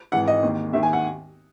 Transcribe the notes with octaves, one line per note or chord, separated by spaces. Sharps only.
G#1 G#2 E3 F#5
D#5
D#2 D#3
D#2 D#3 E5
G#5
F#5